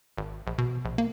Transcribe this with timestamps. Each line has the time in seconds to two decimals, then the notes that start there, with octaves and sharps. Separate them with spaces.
0.18 G#1
0.47 A#1
0.58 B2
0.85 A#1
0.98 A#3